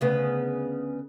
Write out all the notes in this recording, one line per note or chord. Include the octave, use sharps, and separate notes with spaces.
D2 C#3 B3